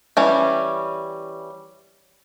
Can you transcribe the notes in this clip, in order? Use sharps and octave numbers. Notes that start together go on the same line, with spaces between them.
E3 G3 C#4